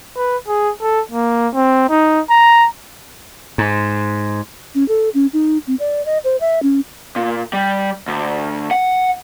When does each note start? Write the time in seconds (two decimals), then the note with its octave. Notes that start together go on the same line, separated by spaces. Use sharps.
0.17 B4
0.48 G#4
0.82 A4
1.11 A#3
1.54 C4
1.90 D#4
2.30 A#5
3.58 G#2
4.75 C#4
4.88 A4
5.14 C#4
5.33 D#4
5.67 C4
5.79 D5
6.06 D#5
6.24 C5
6.41 E5
6.63 C#4
7.16 A#2
7.53 G3
8.08 D2
8.71 F#5